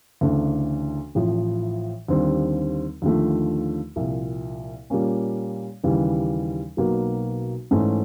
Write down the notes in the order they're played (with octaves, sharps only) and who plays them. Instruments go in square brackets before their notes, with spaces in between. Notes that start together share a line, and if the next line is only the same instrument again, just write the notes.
[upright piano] D2 C#3 E3 A3 D4
A1 A2 F3
D#2 D3 G3 C4 F4
D#2 D3 F3 A3
C2 A#2 F3
A#2 G3 A#3 C#4
D#2 C#3 E3 G3
B1 B2 F#3 A#3
G#2 E3 A3 C#4